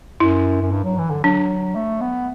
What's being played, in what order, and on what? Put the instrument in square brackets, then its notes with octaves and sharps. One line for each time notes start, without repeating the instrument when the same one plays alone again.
[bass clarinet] F#2 [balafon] E4
[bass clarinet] F#2
G2
F#3
E3
D3
[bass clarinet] F#3 [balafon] D4
[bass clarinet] A3
B3